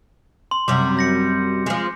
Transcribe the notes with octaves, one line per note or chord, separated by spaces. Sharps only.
C6
F#2 C3 G3 D6
G6 A#6 C#7
F3 G#3